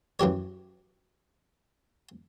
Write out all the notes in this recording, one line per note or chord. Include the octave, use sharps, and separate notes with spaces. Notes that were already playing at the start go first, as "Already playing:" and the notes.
F#2 E3 G4 C#5